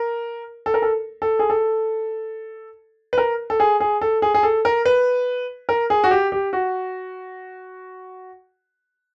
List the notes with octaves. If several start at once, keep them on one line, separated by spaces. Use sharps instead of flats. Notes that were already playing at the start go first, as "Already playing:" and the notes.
Already playing: A#4
A4
A#4
A4
A4
G#4
A4
B4
A#4
A4
G#4
G#4
A4
G#4
G#4
A4
A#4
B4
A#4
G#4
F#4
G4
G4
F#4